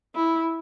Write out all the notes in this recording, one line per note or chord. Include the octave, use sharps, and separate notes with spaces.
E4